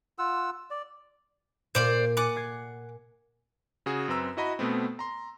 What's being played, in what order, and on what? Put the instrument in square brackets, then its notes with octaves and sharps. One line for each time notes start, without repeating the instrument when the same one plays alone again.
[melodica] F4 F#5 E6
D5
[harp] A#2 [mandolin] C5 D5 F5
[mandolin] F#5 D6 [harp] G#5 A6 D#7
[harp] G#6 C7
[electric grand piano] C#3 F#4 G#4
F#2 C4 B4 A#5 E6
E4 F#4 D#5 A#5 B5
B2 A3 B3 C4
A#5 C6